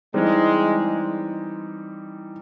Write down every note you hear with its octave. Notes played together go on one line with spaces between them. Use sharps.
E3 G3 G#3 C4 D#4